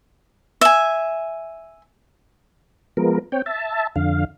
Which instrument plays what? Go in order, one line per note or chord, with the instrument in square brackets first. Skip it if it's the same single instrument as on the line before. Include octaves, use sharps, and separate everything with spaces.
[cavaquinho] E5 G#5
[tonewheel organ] F3 G#3 B3 A#4
C4 C#5 G5
E5 A5
F2 D3 F5